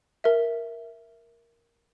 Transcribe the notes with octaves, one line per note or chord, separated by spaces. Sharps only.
A#4 E5